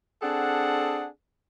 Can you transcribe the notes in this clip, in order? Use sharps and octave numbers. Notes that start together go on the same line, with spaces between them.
C4 D4 G#4 A4 F#5